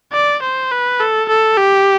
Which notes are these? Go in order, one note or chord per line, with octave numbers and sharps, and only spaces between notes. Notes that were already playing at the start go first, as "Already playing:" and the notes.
D5
C5
B4
A4
A4
G4